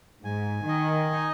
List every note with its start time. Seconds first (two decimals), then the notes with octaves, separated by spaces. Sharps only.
0.24 G#2 G#5
0.68 D#3 D#5
1.13 D#4